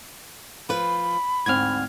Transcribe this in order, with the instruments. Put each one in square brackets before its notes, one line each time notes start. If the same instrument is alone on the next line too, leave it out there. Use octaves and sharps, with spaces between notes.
[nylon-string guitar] F3 B4 [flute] B5
[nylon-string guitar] D2 G#2 C4 [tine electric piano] F6 G#6